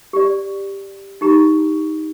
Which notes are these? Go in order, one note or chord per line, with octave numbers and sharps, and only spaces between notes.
G4 D5
D#4 G4 A#5 C#6